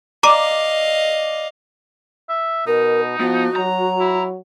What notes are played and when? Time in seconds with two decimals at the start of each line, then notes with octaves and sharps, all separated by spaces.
0.23 D5 D#5 F5 A#5 D6 D#7
2.29 E5
2.67 B2 D#4 A#4
3.20 F3 B3 F#4
3.56 F#3 A#5
4.00 E4